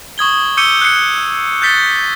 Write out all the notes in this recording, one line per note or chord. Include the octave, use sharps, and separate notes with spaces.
C#6 D#6 G#6 G7
D6 E6 G6 C#7 D#7 G7
F#6 C7 C#7
F#6 G6 A6 B6 G7